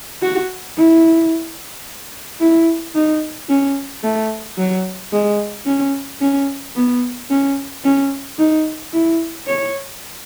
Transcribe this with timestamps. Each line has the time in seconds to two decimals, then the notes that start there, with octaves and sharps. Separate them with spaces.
0.22 F#4
0.77 E4
2.40 E4
2.94 D#4
3.49 C#4
4.03 A3
4.58 F#3
5.12 G#3
5.66 C#4
6.21 C#4
6.75 B3
7.30 C#4
7.84 C#4
8.38 D#4
8.93 E4
9.47 C#5